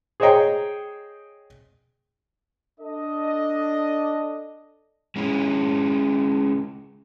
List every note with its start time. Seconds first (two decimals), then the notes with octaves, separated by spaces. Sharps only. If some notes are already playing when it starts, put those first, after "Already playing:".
0.20 G#4 C5 C#5 D#5 G5 A#5
2.80 D4 A4 D#5
5.16 G#3 C#4 E4